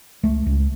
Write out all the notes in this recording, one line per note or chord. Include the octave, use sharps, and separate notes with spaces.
C#2 A3
C#2